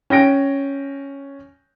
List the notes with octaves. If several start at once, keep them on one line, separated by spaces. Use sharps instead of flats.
C#4 G5 A#6 D7